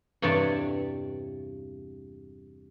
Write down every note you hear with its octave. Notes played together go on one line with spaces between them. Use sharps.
E2 G2 C3 C#5 D5 A5